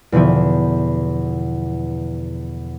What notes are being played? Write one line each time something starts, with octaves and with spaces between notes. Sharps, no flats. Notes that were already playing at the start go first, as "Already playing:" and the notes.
E2 B2 D3 F3 E4